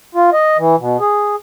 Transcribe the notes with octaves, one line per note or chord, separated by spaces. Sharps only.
F4
D#5
E3
B2
G#4